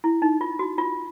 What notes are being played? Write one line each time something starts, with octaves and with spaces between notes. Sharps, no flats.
E4
D#4
F4
F#4
F4